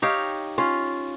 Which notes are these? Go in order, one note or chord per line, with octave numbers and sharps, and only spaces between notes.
D#4 G4 C#5 F5
C#4 F4